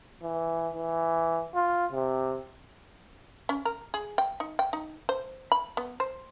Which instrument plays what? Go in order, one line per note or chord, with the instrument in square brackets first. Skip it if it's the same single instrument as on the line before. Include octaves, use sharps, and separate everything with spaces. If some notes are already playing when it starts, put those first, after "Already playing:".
[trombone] E3
E3
F4
C3
[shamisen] C#4
A#4
G#4
G5
D#4
G5
D#4
C5
B5
B3
C5